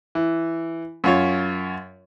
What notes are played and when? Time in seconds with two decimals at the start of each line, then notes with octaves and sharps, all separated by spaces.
0.15 E3
1.04 F#2 F4 C#5